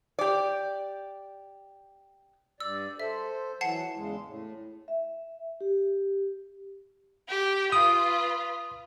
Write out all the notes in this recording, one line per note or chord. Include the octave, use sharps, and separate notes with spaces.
G4 D5
G2 D5 E6
A4 C5 E5
E3 F#3 F#5 A5 C7
E2 C#3 G#3
A2
E5
G4
G4
F4 B4 D#6